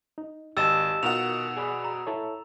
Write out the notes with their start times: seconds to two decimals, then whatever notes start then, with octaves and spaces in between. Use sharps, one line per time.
0.18 D#4
0.57 G#1 G4 D#5 A5 E6 A6 E7
1.03 B2 D#4 F4 A#4 F#5 F7
1.57 G#4 D5 B5
1.85 A#5
2.07 E4 A4 C#5